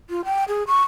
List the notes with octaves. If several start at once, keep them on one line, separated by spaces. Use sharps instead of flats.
F4
G5
G#4
C#6